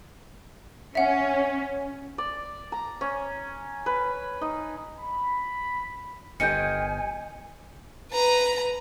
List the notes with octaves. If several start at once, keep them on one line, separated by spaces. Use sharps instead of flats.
C#4 E5 F#5
D5
A#5
C#4
B4
D#4
B5
G1 D#3 D#4 G5 G#5 G6 C#7
B4 A#5